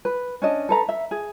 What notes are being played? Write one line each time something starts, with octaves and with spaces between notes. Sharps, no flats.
B4
C#4 D4 D#5
A4 B4 A#5
E5
G#4